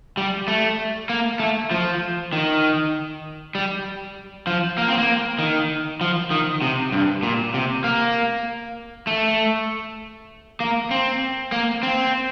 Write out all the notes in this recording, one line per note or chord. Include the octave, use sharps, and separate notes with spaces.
G3
A3
A#3
A3
F3
D#3
G3
F3
A#3
C4
A#3
D#3
F3
D#3
C3
G2
A#2
C3
A#3
A3
A#3
C4
A#3
C4